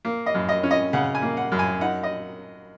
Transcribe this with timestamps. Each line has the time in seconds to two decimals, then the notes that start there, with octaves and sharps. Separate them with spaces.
0.05 A#3
0.26 D#5
0.34 F#2
0.49 D#5
0.63 C#4
0.71 D#5
0.93 C#3 F#5
1.15 G#5
1.22 A#3
1.37 F#5
1.52 F#2
1.59 G#5
1.81 D#4 F#5
2.03 D#5